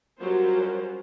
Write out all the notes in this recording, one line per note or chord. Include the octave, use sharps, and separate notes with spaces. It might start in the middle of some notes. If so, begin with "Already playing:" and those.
F#3 G3 C#4 F4 A#4 C5